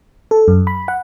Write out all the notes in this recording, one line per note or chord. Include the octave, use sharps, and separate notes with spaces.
A4
F#2
B5
F#5